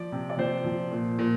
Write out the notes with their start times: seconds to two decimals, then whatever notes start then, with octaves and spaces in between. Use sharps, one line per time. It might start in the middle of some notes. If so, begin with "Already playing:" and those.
Already playing: F3 D5
0.12 C3
0.30 D5
0.38 F3 C5
0.64 F3
0.91 A#2
1.19 A#2